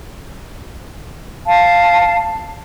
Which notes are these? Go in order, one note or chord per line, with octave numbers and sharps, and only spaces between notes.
F5 A5